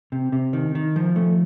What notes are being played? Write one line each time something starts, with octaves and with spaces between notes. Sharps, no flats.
C3
C3
D#3
D#3
F3
A3